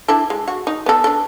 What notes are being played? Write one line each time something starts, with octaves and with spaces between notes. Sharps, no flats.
D4 E4 A4
G#3
F#4
D#4
B3 A4
D4 A4